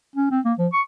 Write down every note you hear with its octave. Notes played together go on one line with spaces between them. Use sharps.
C#4
C4
A#3
F3
C#6